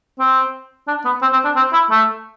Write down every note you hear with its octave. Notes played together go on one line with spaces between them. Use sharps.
C4
D4
B3
C4
C4
D4
C4
E4
A3